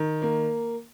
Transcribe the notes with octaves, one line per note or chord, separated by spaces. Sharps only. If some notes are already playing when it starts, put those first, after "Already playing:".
Already playing: D#3
A#3